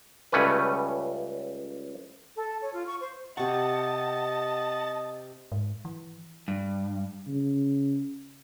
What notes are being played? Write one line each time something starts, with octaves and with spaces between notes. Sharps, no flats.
C#2 C#3 G3 A3 C#4 B4
A4
C#5
F4
C#6
C5
C3 D#5 F#5 A5 C#6
G#2
E3
G2
C#3